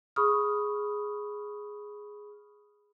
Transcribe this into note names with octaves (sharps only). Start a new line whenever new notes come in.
G#4 B5 C#6 D#6 F6